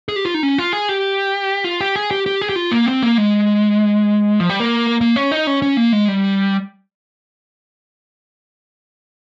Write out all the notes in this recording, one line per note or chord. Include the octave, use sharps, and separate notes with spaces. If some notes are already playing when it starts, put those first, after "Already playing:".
G#4
G4
F4
D#4
C#4
F4
G#4
G4
F4
G4
G#4
G4
G4
G#4
G4
F4
A#3
C4
A#3
G#3
F3
G3
A#3
A#3
C#4
D#4
C#4
C#4
A#3
G#3
G3